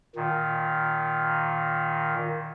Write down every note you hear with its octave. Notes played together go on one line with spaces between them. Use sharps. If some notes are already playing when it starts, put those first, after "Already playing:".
A#2 D#3